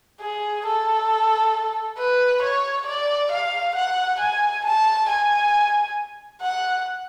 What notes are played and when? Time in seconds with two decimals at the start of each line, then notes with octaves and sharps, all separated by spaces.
0.20 G#4
0.66 A4
1.98 B4
2.42 C#5
2.86 D5
3.32 F5
3.76 F#5
4.20 G#5
4.64 A5
5.09 G#5
6.41 F#5